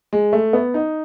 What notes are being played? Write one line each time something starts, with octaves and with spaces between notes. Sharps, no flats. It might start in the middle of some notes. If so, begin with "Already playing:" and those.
G#3
A3
B3
D#4